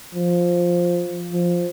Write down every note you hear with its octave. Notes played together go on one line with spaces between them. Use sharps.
F3
F3